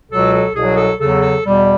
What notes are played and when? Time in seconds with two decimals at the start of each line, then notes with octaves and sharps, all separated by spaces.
0.10 C#2 B2 F#3 A4
0.33 A4
0.55 C2 B2 F#3 G#4
0.77 A4
0.99 E2 C#3 F#3 A4
1.22 A4
1.44 E2 B2 G3